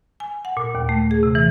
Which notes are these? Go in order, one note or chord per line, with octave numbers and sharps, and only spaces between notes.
G#5
F#5
A#2
D#2
A3
G#4
C3
E3